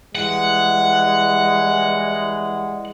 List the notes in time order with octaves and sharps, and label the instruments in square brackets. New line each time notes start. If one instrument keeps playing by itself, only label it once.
[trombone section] E3 G3 G#3 [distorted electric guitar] F#5